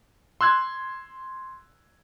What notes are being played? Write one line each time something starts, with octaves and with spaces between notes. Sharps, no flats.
C6 E6 F#6 G#6